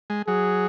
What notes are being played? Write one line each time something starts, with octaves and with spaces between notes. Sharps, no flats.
G#3
F#3 G#4